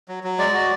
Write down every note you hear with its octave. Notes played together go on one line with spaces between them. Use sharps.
F#3
F#3
G#3 D5
F#4